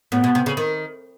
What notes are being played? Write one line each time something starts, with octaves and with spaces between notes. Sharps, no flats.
A2 B3
B2
C3
C#3
D#3